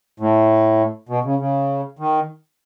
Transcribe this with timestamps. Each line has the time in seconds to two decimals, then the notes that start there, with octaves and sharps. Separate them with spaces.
0.20 A2
1.09 B2
1.24 C#3
1.39 C#3
1.99 D#3